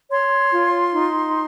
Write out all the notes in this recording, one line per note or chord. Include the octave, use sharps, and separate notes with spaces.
C#5 C6
F4
D#4